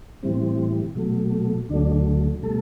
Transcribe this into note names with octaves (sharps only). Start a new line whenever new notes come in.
A2 E3 G3 C4
B2 F#3 A3
D2 D3 F#3 A3 D4
B2 G3 A3 A4